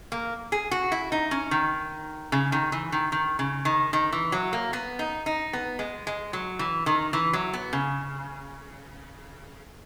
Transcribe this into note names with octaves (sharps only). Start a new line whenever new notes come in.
A#3
G#4
F#4
E4
D#4
C#4
D#3
C#3
D#3
E3
D#3
D#3
C#3
D#3
D#3
E3
F#3
A#3
B3
D#4
D#4
B3
G#3
G#3
F#3
E3
D#3
E3
F#3
B3
C#3